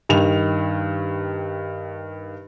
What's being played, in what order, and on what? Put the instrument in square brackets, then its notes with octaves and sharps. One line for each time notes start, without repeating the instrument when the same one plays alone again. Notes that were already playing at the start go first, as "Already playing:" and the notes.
[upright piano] G2 D#3 F7